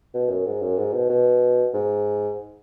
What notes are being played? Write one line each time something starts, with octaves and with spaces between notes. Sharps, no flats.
B2
F#2
G#2
F#2
G#2
B2
B2
G#2